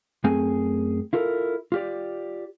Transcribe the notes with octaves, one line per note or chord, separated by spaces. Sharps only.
F#2 A3 C4 G#4 G#5
E4 F4 A4 A#4
F4 G4 D5